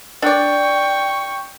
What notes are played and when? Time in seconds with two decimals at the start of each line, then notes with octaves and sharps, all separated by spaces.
0.22 D4 D5 G5 C#6